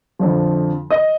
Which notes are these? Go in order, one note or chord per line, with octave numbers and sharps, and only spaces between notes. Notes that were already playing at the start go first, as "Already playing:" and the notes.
F2 D3 F3
D#5